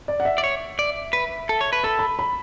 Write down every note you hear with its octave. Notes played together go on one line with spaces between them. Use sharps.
D5
F#5
E5
D5
C#5
D5
B4
A4
C#5
B4
A4 B5
B5
B5